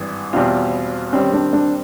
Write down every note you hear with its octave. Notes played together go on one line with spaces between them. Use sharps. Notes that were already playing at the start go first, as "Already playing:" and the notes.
Already playing: G#1 G2 E3
E2 B2 G3 C4 F4
D#3 G3 C4 C#4
D4
D4